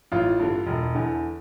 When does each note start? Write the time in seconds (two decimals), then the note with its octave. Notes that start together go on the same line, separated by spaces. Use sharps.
0.12 A1 F4
0.39 G2 D3
0.67 E1
0.95 E2 D3